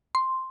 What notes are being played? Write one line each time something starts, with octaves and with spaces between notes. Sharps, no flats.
C6